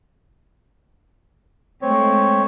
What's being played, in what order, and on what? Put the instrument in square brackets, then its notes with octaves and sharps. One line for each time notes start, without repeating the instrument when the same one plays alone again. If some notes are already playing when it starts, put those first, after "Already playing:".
[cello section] G#3 A3 [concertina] C4 C#5